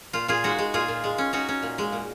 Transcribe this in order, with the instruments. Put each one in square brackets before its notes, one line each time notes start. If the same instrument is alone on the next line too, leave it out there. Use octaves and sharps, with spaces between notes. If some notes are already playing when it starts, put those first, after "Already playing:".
[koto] A#2 F4
A#2 F4 G#4
G#3 D#4 F#4
G#3
A#2 F4 G#4
A#2
G#3
C#4
C#4 D#4 F#4
C#4
A#2
G#3
A#2